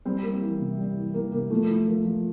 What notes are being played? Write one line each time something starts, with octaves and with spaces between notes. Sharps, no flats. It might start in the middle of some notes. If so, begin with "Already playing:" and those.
G3 C4
G3 A#3
E3
C3
G3
E3
E3 A#3
C3 A#3
F3 A3
A2
F3 A#3
F3